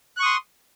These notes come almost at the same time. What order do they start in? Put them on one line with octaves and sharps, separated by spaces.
F#6 C#6 D#6 C6